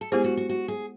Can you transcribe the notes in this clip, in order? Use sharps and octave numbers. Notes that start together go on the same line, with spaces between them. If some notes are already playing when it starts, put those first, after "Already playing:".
A4
G#3 B3 E4 G4 G#4 C5
F#4
F#4
F#4
G#4